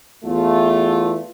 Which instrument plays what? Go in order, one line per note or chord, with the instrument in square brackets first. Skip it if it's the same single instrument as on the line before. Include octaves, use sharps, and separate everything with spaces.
[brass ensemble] E2 A3 F4